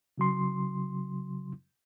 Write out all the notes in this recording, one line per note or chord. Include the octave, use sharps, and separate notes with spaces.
C#3 F#3 C6